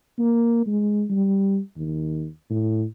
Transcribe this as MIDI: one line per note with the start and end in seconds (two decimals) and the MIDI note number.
0.19 0.64 58
0.67 1.04 56
1.10 1.59 55
1.76 2.27 39
2.50 2.84 45